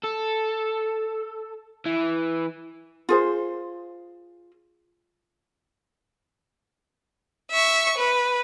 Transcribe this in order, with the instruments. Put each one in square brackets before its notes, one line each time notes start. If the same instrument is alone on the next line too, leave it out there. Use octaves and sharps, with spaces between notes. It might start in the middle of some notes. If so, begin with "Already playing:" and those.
[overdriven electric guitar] A4
E3
[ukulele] F4 G#4 C5
[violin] E5 C#6
B4